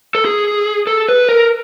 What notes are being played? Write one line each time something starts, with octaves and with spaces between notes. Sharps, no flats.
A4
G#4
A4
B4
A#4